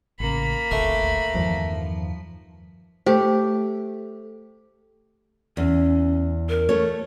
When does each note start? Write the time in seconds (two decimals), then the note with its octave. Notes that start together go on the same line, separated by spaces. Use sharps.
0.20 A1 C#3 A#3 B5
0.71 D#1 G#1 D2 A3
1.34 E2 G2 D#3 F3
3.06 A3 G4 C5
5.57 E2 C#4
6.49 A#4
6.69 A3 C#5